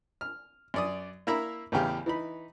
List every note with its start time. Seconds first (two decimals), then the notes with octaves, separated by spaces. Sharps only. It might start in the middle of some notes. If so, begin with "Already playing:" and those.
0.21 F6
0.74 F#2 D5 D#6
1.27 A#3 E4 E5 A#5 B5
1.72 A1 E2 C#3 G4 F5
2.06 E3 D#4 B5